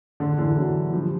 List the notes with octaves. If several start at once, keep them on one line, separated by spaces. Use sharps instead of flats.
D3
D3 E3
E3 F#3
F3 G3